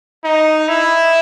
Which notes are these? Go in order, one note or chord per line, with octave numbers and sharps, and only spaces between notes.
D#4
E4